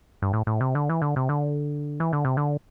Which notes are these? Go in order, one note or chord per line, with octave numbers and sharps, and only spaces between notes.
G2
A2
A2
C3
D3
E3
D3
C3
D3
E3
D3
C3
D3